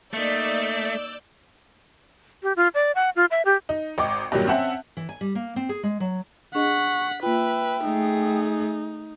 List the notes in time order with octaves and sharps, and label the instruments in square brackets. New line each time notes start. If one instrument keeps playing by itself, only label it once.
[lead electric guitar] A3 [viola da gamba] A#3 D#4 [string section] D5 E6 G6
[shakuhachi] G4
F4
D5
F#5
F4
E5
G4
[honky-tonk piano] D#4
G#1 D#5 G5 D6
G2 A#2 D#3 F#3 G3
C4 C#4 E5 F#5 A5
[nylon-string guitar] E3
G#5
G3
A#3
C4
G#4
G#3
F#3
[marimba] D4 G#4 D#5 [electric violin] F#5 B6 [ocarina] C#6
[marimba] A#3 F4 [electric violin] B4 E5 [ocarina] G5
[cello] A3 G#4 [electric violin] D#4